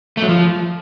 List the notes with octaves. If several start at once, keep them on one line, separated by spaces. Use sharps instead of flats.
A3
F#3
F3